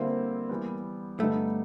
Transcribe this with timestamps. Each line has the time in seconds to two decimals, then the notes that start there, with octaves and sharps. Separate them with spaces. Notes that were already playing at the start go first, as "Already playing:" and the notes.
Already playing: D3 G3 A#3 C4 E4
0.49 E3 G3 B3
1.20 G2 D3 G3 A3 B3 D#4